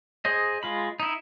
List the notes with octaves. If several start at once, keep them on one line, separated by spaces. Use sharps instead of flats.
G#4 C5 D#5
G#3 F4 B5
D#4 E4